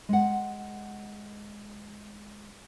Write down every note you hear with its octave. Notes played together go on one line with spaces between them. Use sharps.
G#3 F#5